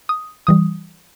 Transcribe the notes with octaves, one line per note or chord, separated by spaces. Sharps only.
D#6
E3 G3 D#6